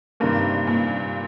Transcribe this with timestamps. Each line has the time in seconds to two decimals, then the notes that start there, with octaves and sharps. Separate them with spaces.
0.20 G2 C3 D#3 A#3
0.67 A#2